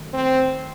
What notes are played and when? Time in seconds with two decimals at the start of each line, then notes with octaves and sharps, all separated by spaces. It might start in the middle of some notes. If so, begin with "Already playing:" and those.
Already playing: F#2 D#3 A3 A4
0.13 C4